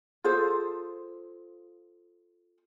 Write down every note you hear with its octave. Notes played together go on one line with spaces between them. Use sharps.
F4 G#4 A4 C5